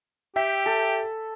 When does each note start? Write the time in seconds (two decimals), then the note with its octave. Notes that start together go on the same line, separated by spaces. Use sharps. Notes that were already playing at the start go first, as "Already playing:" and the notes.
0.36 G4 E5 G5 B6
0.66 A4